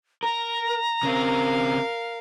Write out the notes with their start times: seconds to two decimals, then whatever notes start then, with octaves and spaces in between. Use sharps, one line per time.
0.23 A#4 A#5
1.03 C#3 C4 A#4 F5